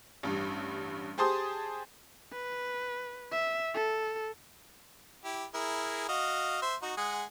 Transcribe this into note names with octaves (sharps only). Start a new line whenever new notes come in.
A1 G2
G4 G#4 C5 A5 C6 D#6
B4
E5
A4
E4 G4
E4 G#4 A#4
F#4 D#5 F5
C5 E5
D#4 F#4
G#3 G#4 F#5